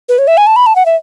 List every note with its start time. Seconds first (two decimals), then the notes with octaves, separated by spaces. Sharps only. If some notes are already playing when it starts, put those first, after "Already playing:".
0.09 B4
0.18 C#5
0.27 E5
0.37 G#5
0.47 A5
0.56 B5
0.66 A5
0.76 F#5
0.86 E5